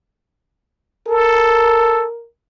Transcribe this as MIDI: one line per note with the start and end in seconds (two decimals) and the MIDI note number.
1.08 2.05 69
1.08 2.26 70